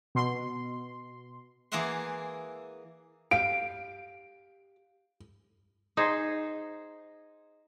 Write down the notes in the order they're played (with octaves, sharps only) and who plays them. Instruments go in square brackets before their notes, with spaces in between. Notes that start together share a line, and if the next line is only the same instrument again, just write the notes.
[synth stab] B2 C6
[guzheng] E3 A#3 G#4 E5 F#5 C6
[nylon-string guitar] G4 F5 [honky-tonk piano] D7
[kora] D#4 G#4 C5